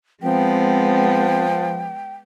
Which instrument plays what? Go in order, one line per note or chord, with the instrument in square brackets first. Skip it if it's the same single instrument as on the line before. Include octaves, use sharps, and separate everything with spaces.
[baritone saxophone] F3 [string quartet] G#3 B3 [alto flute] C4 [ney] G5